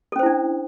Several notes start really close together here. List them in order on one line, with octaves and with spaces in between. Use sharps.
A4 C#4 C5 E4 D4